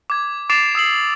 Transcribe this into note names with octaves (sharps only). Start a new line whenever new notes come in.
D6 G#6
D6 A6 C7 D7 E7 F7
D#6 E6 C7 F#7